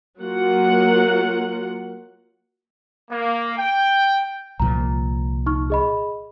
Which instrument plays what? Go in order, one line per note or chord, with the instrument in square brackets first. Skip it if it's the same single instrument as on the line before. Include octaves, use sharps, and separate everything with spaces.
[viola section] F#3 A#3 F4 F#4 A#4 F#5
[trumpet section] A#3
G5
[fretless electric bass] C2 A#2 F3 [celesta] A#5
[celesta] D#4 C#6 F6
G#4 D#5 B5